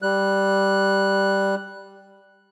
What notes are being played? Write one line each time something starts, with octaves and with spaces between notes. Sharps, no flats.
G3 F#6